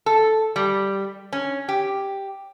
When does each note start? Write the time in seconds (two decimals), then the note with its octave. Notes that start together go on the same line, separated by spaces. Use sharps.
0.06 A4
0.56 G3
1.33 C#4
1.69 G4